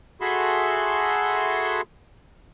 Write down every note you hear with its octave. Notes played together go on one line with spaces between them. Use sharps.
F#4 G#4 A4 E5 B5 C6